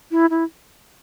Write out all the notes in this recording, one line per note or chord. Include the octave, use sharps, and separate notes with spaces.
E4
E4